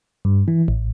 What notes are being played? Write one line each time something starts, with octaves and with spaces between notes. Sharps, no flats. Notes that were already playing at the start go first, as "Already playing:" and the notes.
G2
E3
A1